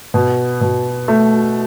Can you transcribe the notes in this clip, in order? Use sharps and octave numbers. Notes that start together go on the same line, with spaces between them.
B2
B2
A3